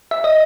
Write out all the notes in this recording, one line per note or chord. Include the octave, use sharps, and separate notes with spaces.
E5
D#5